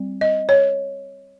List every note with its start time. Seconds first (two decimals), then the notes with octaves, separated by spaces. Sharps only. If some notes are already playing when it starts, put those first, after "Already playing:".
Already playing: G3 C4
0.21 D#5
0.49 C#5